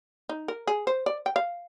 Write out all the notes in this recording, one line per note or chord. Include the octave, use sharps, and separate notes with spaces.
D#4
A#4
G#4
C5
D5
G5
F5